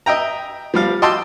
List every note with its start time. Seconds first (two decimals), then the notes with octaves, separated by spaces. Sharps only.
0.06 D#5 E5 G5 A#5
0.74 F3 G3 F5
1.02 D#5 G5 A5 C6 D6 E6